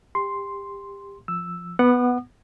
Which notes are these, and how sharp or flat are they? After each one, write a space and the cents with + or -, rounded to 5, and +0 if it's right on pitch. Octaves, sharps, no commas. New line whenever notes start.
G4 +25 C6 +0
F3 +0 E6 +0
B3 +0 F#5 +0 D#6 -40